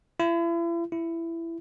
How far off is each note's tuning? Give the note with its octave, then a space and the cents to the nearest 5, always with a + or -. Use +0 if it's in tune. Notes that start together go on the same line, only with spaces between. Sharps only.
E4 +40
E4 +15